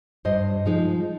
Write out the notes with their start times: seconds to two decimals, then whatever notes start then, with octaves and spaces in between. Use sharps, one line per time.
0.25 G2 C5 D#5
0.66 F3 G#3 D#4